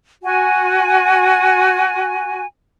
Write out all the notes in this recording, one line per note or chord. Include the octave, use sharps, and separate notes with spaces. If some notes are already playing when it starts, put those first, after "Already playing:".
F#4 G#5